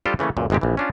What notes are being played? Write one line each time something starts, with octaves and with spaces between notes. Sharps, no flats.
G3 D4 F4 G4 A4 C5
C#3 E3 A3 A#3 C#4
C#2 F#2 A#2
G1 C3 G#3 C4 G4
A#1 E3
C#4 D4 F4